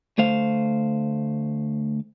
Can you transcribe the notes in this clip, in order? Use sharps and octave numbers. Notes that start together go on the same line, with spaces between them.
D2 A3 C5 F5